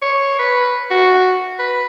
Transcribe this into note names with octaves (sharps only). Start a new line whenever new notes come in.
C#5
B4
F#4
B4